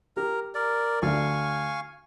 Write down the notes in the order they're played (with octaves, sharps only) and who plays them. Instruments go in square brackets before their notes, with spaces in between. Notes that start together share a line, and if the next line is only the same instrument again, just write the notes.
[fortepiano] G4 [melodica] A#4 A#5
[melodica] A#4 D5
[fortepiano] D2 [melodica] F5 G#5 C#6